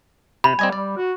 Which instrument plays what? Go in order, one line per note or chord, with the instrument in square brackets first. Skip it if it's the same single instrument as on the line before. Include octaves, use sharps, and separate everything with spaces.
[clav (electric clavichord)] C3 [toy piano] B5
[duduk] G3 [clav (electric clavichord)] C4 D#5 G#5
[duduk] G3 [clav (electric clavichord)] D5
[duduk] F#4